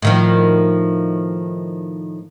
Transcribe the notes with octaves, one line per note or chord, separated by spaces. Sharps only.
A2 D#3 F3